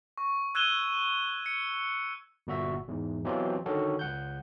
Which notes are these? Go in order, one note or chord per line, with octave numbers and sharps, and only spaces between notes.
C#6
E6 F#6 G#6 D#7 E7 G7
C#7
G1 A#2 F#4 E5
E2 G#2
B2 E3 F#3 C4 F4 G4
D3 D#3 C#4 F#4 A4
C#2 F#5 G6